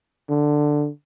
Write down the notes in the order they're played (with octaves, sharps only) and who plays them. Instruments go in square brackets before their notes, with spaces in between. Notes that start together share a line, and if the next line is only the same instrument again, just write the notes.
[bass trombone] D3